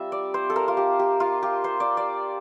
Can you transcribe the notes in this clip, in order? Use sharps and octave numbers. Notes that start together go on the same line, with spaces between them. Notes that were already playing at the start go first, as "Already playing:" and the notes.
Already playing: G3 C4 F4 E5
D5
C5
A4
A#4
F4
G4
G4
F4
G4
C5
D5
D5